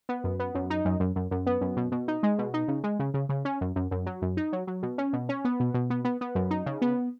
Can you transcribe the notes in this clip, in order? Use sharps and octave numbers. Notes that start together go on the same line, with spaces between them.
B3
F#2
B3
F#2
D#4
F#2
F#2
F#2
F#2
B3
F#2
B2
B2
D#4
G#3
B2
D#4
C#3
G#3
C#3
C#3
C#3
C#4
F#2
F#2
F#2
F#3
F#2
D#4
F#3
F#3
B2
C#4
B2
C#4
B3
B2
B2
B3
B3
B3
F#2
D#4
C#3
B3